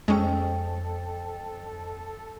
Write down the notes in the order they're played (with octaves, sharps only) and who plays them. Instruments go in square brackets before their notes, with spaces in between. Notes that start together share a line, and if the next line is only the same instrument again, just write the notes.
[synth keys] F2 G5 [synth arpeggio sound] G#3 C#4 [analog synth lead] A4